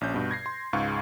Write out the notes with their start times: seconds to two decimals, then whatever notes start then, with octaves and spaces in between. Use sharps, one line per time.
0.01 A#1 C#4 G6
0.14 G2 B2
0.31 G#6 A#6 C7
0.46 C6
0.73 C#2 G#2 G#3 F5 C#6